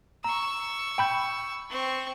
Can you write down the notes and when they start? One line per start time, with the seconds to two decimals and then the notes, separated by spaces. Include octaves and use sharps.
0.24 A#5 C#6 E6
0.98 G5 B5 G6
1.70 C4 C#6